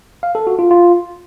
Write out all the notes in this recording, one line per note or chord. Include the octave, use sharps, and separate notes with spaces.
F5
A4
F#4
F4
F4